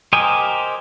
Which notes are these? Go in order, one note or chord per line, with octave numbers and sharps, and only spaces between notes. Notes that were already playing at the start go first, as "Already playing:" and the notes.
G4 A#4 C5 D#5 G#5